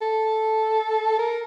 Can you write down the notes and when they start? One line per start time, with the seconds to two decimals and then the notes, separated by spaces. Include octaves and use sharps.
0.01 A4
1.19 A#4